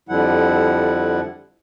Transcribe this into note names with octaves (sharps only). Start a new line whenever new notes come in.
F2 D3 F3 G3 E4 F#5